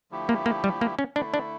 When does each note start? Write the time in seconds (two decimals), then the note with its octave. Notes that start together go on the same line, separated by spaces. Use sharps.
0.11 D3 F3 A3 E4 G4
0.29 A#3
0.46 A#3
0.64 G3
0.81 A#3
0.99 C#4
1.16 D3 A3 D4 E4
1.34 D4